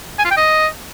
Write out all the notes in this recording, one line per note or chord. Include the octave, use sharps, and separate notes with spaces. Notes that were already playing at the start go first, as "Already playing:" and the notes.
G#5
F4
G5
D#5